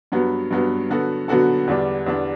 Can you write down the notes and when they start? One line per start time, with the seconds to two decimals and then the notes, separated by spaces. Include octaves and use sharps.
0.12 G2 F#3 B3
0.50 G2 F#3 B3
0.90 D3 F#3 B3 F#4 A4
1.28 D3 F#3 B3 F#4 A4
1.67 E2 D3 G3 D4
2.06 E2 D3 G3 D4